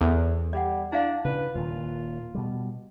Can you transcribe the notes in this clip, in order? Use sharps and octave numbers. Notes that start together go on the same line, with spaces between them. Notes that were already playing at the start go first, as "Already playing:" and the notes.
E2 A4 C5
G3 D5 F#5
D4 E4 D5 F5
C#3 C#4 D4 B4
D#1 A#2 D#3 F4
B2 G3